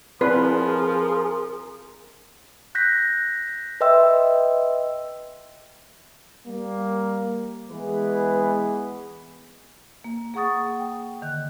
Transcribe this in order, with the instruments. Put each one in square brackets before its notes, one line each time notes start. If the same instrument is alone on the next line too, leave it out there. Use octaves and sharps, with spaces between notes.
[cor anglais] F3 [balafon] C4 E4 D5 [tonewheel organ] G#4 A#4 [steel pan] B4
[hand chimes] F#6 G6 A#6 B6
B4 D#5 E5 G5 C6 E6
[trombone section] G3 A#3
E3 G#3 B3 G#4 B4
[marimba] A#3
A#3 G#4 F#5 C#6 D#6 A6
G5
D3 D#3 F#6